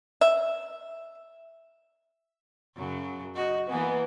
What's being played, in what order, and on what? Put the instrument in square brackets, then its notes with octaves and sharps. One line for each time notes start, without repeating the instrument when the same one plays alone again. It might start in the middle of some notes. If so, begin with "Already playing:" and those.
[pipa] E5
[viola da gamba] F#2 C#3 F#3
[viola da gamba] F#4 [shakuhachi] D#5
[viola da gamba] E3 A#3 [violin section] B3 [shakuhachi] G#5